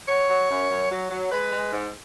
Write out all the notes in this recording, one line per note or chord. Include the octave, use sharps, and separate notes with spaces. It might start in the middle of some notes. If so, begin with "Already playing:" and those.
F#3 C#5
F#3
F#2
F#2
F#3
F#3
G#3 B4
G#3
G#2